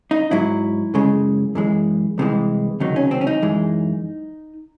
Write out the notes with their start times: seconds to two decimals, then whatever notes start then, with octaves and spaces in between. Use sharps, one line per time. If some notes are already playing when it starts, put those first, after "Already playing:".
0.11 D#4
0.31 G#2 F#3 E4
0.94 F#2 C#3 G#3
1.55 F#2 E3 G#3
2.18 C2 C3 E3 G#3
2.80 C#2 C3 D#3 F#3 D#4
2.96 C#4
3.11 C4
3.21 C#4
3.27 D#4
3.42 F#2 E3 G#3